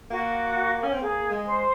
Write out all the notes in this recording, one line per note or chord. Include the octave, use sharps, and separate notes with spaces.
A#3 F#4
C#4
C4
A#3 G#4
G#3
C5